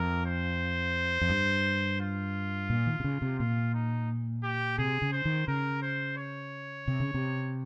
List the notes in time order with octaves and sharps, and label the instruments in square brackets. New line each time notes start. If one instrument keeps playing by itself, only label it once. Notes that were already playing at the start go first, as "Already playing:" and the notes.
Already playing: [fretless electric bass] F2 [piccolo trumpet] A#4
[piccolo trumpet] C5
[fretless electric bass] F2
G2
[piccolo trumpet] F4
[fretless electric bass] A#2
D#3
C3
C#3
C3
[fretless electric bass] A#2 [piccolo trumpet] F4
[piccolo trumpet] D#4
G4
[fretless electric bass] C3 [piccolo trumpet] G#4
[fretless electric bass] C#3
[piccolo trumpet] C5
[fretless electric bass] D#3
[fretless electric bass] C#3 [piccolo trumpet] A#4
[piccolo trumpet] C5
C#5
[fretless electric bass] C3
C#3
C3